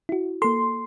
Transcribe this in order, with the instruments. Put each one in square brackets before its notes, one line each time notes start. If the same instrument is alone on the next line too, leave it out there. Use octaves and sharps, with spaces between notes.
[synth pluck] E4 F#4
[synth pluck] A#3 A4 [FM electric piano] C6